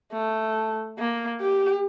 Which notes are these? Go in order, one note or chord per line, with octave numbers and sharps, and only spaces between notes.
A3
A#3
G4